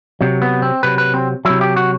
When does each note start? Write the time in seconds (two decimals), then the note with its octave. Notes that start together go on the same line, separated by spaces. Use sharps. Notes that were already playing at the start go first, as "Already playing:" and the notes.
0.21 C3 F#3
0.42 B3
0.62 C4
0.83 C3 F#3 B4
0.98 B4
1.14 C4
1.45 C3 F#3 E4
1.61 G4
1.76 F#4